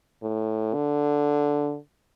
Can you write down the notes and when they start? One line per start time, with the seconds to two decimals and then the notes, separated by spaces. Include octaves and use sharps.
0.22 A2
0.74 D3